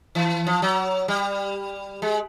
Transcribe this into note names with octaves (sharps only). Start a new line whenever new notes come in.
E3
F3
F#3
G3
G#3